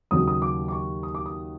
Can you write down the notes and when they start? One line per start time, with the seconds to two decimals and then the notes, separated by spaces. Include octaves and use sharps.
0.11 D#2 C#3 F#3 D#6
0.28 D#6
0.42 D6
0.68 D6
0.72 C#6
1.03 D#6
1.15 D6
1.26 D#6